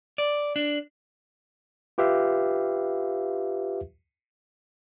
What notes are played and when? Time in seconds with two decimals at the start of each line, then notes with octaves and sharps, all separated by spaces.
0.18 D5
0.56 D4
1.98 F4 G4 B4 E5 F5